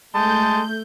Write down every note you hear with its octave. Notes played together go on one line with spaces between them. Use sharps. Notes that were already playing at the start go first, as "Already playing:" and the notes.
G#3 A3 A5 G6